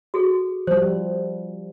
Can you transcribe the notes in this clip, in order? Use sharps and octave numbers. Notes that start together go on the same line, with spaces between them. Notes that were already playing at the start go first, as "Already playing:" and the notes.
F#4 G#4 A4
F3 G3 C5